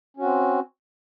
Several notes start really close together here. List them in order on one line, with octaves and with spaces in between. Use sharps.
C#4 F#4 C4